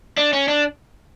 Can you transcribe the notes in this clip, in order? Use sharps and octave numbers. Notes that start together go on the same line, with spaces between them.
D4
C#4
D4